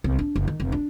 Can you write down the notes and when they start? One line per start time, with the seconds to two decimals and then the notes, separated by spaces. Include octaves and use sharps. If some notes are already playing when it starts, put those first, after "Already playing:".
0.04 C2
0.19 D4
0.36 F#1
0.48 D#3
0.60 F1
0.72 D4